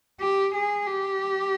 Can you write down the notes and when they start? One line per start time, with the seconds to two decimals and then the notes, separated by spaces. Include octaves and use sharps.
0.20 G4
0.54 G#4
0.87 G4